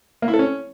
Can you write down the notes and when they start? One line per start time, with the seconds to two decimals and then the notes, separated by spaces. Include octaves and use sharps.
0.22 A#3
0.28 E4
0.34 A4
0.39 C#4